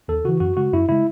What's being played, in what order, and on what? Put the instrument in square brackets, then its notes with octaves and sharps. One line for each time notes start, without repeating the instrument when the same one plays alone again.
[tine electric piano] D#2 A4
C#3 E3 F#4
F#2 F#4
C#3 G#3 F#4
F#2 E4
C#3 G#3 E4